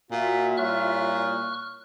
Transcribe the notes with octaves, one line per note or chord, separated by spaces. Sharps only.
A#2 F4 F#4 E5
A#2 G3 E4 C#5 C#6 F6 F#6